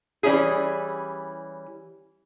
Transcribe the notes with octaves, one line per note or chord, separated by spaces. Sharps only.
E3 G3 C#4 E4 G#4